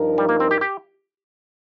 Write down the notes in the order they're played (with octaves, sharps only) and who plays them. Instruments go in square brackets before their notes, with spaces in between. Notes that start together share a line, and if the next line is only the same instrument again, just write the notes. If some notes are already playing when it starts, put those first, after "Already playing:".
Already playing: [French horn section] G2 F3 D#4 A#4
[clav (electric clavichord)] G3
A#3
C4
G4
G4